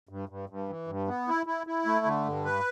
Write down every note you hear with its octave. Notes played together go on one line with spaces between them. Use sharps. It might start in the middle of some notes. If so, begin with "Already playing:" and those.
G2
G2
G2
E3
G2
B3
E4
E4
E4
A3
D3
G2
B4